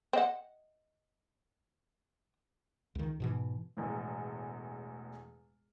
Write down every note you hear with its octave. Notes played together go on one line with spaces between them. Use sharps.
C4 D#5 F#5
C#2 D#3
G#2 B2 E3
E1 E2 A2